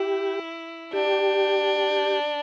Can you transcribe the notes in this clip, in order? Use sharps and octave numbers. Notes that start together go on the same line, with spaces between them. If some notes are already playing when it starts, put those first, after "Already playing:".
Already playing: E4 G4
D4 G4